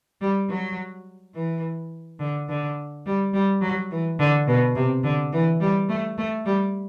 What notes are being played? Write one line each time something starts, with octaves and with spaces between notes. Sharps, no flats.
G3
F#3
E3
D3
D3
G3
G3
F#3
E3
D3
B2
C3
D3
E3
G3
A3
A3
G3